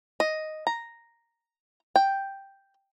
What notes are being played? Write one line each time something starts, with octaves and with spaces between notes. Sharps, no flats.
D#5
A#5
G5